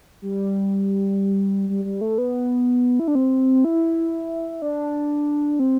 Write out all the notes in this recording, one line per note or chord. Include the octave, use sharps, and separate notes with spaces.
G3
G3
G3
A3
B3
E4
D4
C4
E4
D4
C4